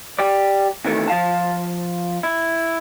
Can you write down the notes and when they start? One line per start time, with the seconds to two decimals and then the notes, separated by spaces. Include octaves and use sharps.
0.19 G4 D5
0.85 C3 D#3 E3 A3
1.08 F3 F5 A5
2.23 E4